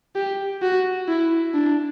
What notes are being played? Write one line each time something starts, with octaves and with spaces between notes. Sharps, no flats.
G4
F#4
E4
D4